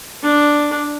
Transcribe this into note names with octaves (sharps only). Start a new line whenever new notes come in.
D4